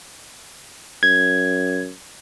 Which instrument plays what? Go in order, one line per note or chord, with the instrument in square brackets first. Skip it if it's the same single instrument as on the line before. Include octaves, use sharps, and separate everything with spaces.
[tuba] F#2 [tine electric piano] G#6